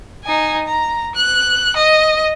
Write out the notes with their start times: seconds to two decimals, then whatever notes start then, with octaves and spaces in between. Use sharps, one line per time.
0.24 D#4 G#5
0.68 A#5
1.16 F#6
1.77 D#5